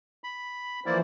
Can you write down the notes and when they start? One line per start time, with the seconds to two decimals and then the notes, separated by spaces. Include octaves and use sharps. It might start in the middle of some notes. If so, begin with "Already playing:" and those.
0.24 B5
0.86 E3 F3 A#3 E4 C5 D5